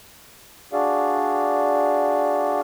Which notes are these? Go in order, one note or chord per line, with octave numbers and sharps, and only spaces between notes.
D4 F#4 G#4 D5 F5